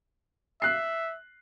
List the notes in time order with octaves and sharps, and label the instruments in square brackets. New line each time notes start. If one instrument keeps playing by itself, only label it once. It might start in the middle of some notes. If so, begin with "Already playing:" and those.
[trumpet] E5 [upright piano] F#6 C7